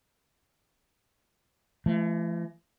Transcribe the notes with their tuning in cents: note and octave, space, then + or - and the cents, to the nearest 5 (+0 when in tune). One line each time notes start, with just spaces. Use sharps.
E3 +40 A3 -20